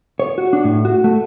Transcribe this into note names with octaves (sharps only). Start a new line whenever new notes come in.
C#5
F#4
D4
A2
F#4
A3